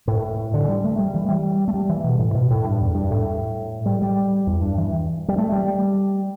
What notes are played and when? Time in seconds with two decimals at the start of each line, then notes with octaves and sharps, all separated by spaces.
0.08 A2
0.54 D3
0.64 E3
0.68 G3
0.84 A3
0.99 G3
1.14 E3
1.28 G3
1.68 A3
1.74 G3
1.89 E3
2.04 B2
2.19 A2
2.34 B2
2.50 A2
2.65 G2
2.81 E2
2.95 G2
3.11 A2
3.86 G3
4.02 G3
4.47 E2
4.61 G2
4.78 E3
5.28 G3
5.38 A3
5.52 G3